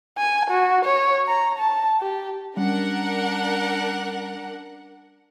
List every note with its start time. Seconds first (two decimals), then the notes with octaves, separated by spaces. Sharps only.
0.18 G#5
0.50 F#4
0.85 C#5
1.28 A#5
1.59 A5
2.00 G4
2.57 G3 C#4 D4 A#4 F#5